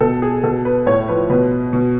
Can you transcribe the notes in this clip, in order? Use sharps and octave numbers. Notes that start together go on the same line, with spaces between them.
B2 A4
G#4
B2 A4
B4
A2 C#5
F3 B4
B2 B4
B2